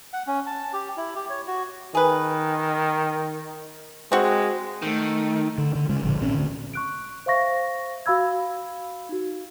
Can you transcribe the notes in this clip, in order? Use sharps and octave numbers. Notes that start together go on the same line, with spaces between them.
F#5
C#4
A5
G4
E4
G4
C#5
F#4
D#3 G#4 B4
G#3 C4 F#4
D#3 A3
D3
D3
C#3 G#3
G#1 A#2 D3 F3
A1 A#2 C4 C#4
D2 D3
C#6 F#6 D7
C5 E5 F5 C#6 A#6
F#4 F5 B5 E6 G#6
D#4 F#4